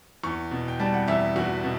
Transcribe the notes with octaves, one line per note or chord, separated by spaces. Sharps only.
E2 C#6
B2
G5
G3 A5
F#5
E2 E5
E2 F#4
B2